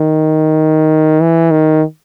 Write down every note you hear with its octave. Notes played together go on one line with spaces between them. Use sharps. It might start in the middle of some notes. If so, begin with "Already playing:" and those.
Already playing: D#3
E3
D#3